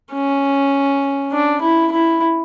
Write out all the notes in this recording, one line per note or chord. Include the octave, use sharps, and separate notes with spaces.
C#4
D4
E4
E4